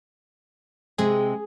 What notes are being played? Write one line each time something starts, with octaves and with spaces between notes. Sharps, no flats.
C3 G#3 C4 G#4